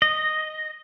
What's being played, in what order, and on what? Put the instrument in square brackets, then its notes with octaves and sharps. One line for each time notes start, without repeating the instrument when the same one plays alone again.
[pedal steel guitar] D#5